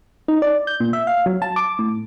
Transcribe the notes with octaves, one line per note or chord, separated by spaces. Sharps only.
D#4
D5
G6
A#2
E5
F5
F#3
A5
D6
A2